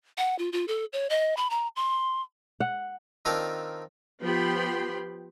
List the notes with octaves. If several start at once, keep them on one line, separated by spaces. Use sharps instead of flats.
F#5
F4
F4
A4
C#5
D#5
B5
A#5
C6
F#5
D#3 C4 D4 F4 A4 A#4
F3 B3 G4 G5 B5 C6